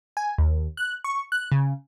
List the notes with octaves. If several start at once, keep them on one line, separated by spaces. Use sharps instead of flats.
G#5
D#2
F#6
C#6
F#6
C#3